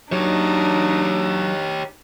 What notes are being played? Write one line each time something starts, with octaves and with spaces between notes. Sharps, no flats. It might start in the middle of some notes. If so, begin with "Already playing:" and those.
F#3 D4 D#4 G4 C#5